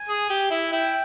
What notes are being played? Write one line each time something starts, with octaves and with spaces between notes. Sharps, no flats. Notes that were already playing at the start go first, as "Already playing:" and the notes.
Already playing: G#5
G#4
G4
E4
E4 G5